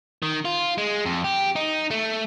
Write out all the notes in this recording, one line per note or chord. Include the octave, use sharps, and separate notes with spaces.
D#3
F4
G#3
F2
G4
D#4
A3